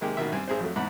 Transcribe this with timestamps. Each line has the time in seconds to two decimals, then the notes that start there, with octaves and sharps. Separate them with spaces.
0.01 C3 D#3 G#3 A#3 G4
0.17 A1 B2 D#3 E5
0.32 G2 C4 C5 G#5
0.48 G#1 G#4 C5
0.60 F2 F#3 A3
0.76 E2 G#2 F#5 B5